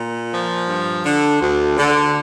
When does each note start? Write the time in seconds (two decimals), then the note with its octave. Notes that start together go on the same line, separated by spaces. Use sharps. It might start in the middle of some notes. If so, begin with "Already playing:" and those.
Already playing: A#2
0.32 F3
0.67 G2
1.04 D3
1.40 D2
1.77 D3